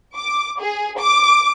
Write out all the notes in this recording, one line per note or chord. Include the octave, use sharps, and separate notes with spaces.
D6
G#4
D6